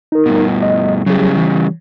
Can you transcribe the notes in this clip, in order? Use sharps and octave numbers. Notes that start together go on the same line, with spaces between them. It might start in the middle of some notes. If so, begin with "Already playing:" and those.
D#4 A#4
G2 B2
D#5
C#3 F#3 G3 G#4
E3